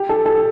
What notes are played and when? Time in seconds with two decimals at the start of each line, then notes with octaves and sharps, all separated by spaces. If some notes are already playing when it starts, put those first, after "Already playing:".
Already playing: G4
0.09 A4
0.26 A4